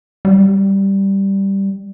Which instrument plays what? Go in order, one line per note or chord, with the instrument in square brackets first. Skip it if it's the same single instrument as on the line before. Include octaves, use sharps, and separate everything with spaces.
[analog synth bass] G3